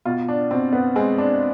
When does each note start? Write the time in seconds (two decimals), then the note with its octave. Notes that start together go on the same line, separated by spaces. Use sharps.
0.05 B2 F4
0.28 D4
0.51 B2 C4
0.73 B3
0.96 G#3 C4
1.18 D4